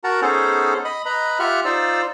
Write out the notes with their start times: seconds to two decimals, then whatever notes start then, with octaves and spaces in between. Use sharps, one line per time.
0.04 F#4 A#4 F#5 A5 A#5
0.22 B3 C#4 D#4 G#4 A4 C5
0.85 D#5 B5 D#6
1.06 B4 D#5 A#5 B5
1.39 F4 G4 E5 F#5 F6
1.65 D#4 F4 C5 D5 E6